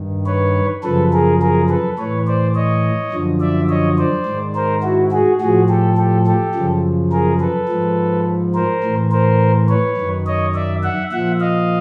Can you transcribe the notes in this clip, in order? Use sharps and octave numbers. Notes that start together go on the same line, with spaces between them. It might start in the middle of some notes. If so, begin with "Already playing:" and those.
Already playing: G2 D#3
B4 C#5
F#2 C#3 F3 A4 B4
G#4 A#4
G#4 A#4
A4 B4
A2 E3 B4 C#5
C5 D5
C#5 D#5
F#2 D3 F3
D5 E5
C#5 D#5
C5 D5
G#2 D#3
A#4 C5
E4 F#4
F#4 G#4
A2 F3 F#4 G#4
G4 A4
G4 A4
G4 A4
F#2 C#3 F3
G#4 A#4
A4 B4
G#2 F3
A#4 C5
A2 E3
A#4 C5
B4 C#5
F#2 D#3
C#5 D#5
D5 E5
E5 F#5
A#2 F3 E5 F#5
D#5 F5